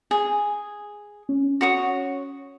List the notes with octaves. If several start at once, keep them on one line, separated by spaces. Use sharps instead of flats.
G#4
C#4
F#4 C#5 D#6